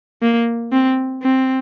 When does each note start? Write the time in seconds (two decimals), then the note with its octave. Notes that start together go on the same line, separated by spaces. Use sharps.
0.22 A#3
0.72 C4
1.22 C4